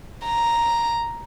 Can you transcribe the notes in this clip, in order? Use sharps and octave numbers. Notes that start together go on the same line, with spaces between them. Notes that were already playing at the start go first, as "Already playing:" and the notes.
A#5